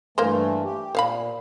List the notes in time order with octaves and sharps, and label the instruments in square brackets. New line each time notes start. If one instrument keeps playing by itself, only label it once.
[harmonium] G2 E3 A3 [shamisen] A#3 A#4 C5
[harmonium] G4
[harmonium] A#2 [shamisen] C5 F5 B5